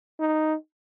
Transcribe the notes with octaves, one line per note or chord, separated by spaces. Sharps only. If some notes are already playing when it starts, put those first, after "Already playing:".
D#4